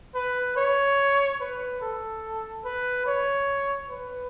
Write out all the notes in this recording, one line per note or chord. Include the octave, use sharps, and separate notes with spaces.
B4
C#5
B4
A4
B4
C#5
B4